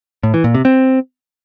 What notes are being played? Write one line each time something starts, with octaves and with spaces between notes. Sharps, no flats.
A2
E3
A#2
C3
C4